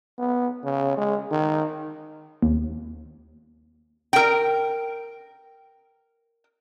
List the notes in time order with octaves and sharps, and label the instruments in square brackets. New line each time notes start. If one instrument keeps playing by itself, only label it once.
[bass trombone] B3
C#3
G#3
D#3
[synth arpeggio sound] D#2
[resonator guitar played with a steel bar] A#4 G5